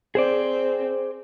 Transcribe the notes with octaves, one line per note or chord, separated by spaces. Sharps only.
C4 G#4 C5 D5